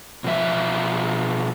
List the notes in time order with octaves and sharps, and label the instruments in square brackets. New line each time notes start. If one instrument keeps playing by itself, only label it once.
[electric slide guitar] B2 F3 E5